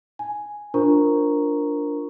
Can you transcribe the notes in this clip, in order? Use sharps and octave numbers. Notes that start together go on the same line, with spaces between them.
G#5
D4 F4 A#4 C5 A#5 C#6